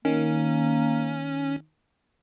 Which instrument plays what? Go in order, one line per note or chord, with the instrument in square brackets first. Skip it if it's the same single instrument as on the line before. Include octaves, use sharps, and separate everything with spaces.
[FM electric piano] D#3 [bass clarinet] A#3 [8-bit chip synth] C#4